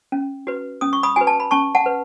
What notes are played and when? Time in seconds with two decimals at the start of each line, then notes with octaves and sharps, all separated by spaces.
0.12 C#4
0.47 F#4 B4
0.81 C#4 D#6
0.93 C#6
1.03 B5 D#6
1.16 F#4 B4 G#5
1.27 A5
1.40 B5
1.51 C#4 A5 C#6
1.75 F#5 A5
1.86 B4